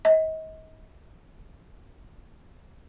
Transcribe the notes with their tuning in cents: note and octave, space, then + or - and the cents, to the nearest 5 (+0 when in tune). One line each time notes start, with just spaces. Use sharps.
D#5 +35